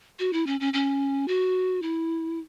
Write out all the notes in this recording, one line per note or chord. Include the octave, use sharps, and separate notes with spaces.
F#4
E4
C#4
C#4
C#4
F#4
E4